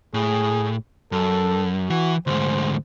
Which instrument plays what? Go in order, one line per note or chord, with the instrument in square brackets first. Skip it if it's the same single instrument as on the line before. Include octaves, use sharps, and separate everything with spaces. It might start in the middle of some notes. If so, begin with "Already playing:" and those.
[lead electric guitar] A2 [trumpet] G#4
[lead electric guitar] F#2 [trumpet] A4
[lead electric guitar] E3 [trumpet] F#4
[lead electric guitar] D2 G#2 [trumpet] C5